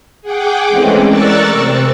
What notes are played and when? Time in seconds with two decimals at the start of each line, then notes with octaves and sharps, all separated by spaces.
0.22 G#4 F#5 G5 D6
0.69 E3 G#3 A3 C4 C#4
1.07 A#4 D5 C#6 E6 F#6 A6
1.52 C3 C4